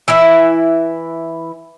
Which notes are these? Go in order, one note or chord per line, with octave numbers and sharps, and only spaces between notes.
E3 E4 E5